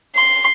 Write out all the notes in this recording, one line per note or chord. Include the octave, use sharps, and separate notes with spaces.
C6